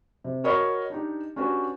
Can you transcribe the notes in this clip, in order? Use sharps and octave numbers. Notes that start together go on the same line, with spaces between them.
C3
F#4 A#4 C#5 D#5 B5 C#6
D4 D#4 G4
C#4 D4 F#4 G4 B4